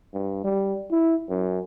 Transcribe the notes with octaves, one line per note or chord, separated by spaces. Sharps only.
G2
G3
E4
F#2